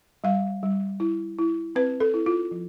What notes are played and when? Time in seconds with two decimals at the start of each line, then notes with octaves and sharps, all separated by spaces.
0.24 G3 F5
0.63 G3
1.00 E4
1.38 E4
1.76 C4 B4
2.00 A4
2.14 E4
2.26 F4
2.51 F3